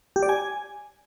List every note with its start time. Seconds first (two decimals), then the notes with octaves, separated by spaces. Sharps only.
0.16 G4
0.23 D5
0.29 G#5